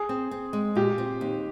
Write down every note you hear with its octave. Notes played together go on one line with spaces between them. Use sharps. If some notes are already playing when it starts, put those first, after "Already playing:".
Already playing: G#4
C4
C4
G#3
A#2 G4
C4
D#2